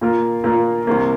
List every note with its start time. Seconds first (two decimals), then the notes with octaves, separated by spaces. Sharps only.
0.01 A#2 A#3 F4 A#4
0.44 A#2 A#3 F4 A#4
0.87 C2 C3 A#3